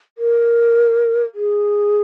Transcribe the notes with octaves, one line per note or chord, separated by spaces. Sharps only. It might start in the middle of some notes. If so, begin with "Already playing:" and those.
A#4
G#4